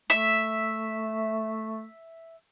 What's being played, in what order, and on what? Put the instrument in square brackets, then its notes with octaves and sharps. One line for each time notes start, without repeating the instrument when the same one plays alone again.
[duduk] A3 [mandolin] E5